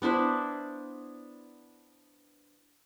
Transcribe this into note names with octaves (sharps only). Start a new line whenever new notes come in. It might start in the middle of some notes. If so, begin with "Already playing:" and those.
B3 D4 E4 C5